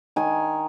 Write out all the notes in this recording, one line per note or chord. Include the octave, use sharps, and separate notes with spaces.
D#3 G#5